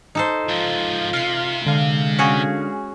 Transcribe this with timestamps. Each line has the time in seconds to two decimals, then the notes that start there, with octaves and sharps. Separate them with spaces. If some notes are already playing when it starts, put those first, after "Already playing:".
0.15 D#4 A4 C5
0.49 G#2 F3 F4
1.14 C3 F6 C7
1.66 D3 G#3 F5
2.18 C#4 F#4 G#4